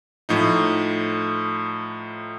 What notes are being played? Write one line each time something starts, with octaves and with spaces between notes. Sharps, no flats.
A2 F3 D#4